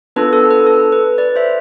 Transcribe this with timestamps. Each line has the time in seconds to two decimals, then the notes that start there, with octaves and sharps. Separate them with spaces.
0.16 B3 D4 F4 A4 B4
0.33 A4
0.51 B4
0.67 A4
0.92 B4
1.18 B4 D5
1.36 C5 E5